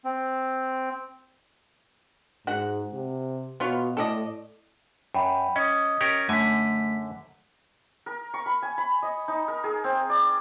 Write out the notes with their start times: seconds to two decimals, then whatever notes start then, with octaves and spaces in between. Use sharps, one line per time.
0.05 C4
2.47 G#2 F#4 F#5
2.93 C3
3.60 B2 B3 F4 C#5
3.97 A2 A4 D5 D#5
5.14 F#2 G5 B5
5.56 C#4 D#5 D#6
6.01 C#4 G4 A#4
6.29 F#2 D3 A3 G#5 B6
8.06 A#4
8.34 C#6
8.46 B5
8.62 G#5
8.78 B5
9.02 D#5
9.28 D#4
9.48 A#4
9.64 G#4
9.84 C4
10.10 D5